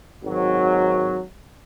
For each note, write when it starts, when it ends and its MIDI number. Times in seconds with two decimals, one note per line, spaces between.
0.24 1.21 32
0.24 1.21 54